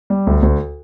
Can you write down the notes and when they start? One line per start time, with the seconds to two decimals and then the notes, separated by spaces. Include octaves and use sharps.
0.10 G3
0.27 D2
0.42 D2